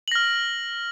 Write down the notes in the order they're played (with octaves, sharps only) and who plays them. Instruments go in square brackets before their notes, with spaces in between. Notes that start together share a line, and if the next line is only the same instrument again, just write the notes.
[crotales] F#7
A#6
F6